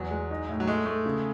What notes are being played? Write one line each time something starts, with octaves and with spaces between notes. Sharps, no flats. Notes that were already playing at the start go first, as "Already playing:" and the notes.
Already playing: E2 F#3
G#3
D#4
A2
F#3
G#3 A3
A3
C#3